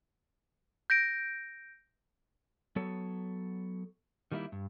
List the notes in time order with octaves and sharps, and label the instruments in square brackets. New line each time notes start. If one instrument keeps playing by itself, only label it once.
[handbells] G6 A#6 D7
[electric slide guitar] F#3 B3 A4 C#5
D#3 G3 A#3 D#4 E4
G2